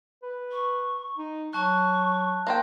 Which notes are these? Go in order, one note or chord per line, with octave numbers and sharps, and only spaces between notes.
B4
C#6
D#4
F#3 A5 C#6 F#6
A#3 C5 G5